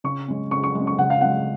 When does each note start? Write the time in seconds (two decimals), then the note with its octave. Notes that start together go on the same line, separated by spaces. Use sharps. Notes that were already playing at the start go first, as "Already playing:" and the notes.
0.04 C#3 C#6
0.28 G#3 C#4
0.51 C#3 C#6
0.63 C#6
0.75 G#3 C#4
0.87 C#6
0.98 C#3 F#5
1.10 F5
1.21 G#3 C#4 F#5